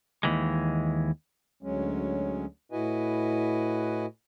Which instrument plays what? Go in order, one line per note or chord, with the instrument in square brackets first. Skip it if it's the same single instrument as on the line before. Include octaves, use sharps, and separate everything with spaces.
[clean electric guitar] D#2 E3 G#3
[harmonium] D2 F#3 G#3 C#4
A2 E4 F#4 B4 D#5 G#5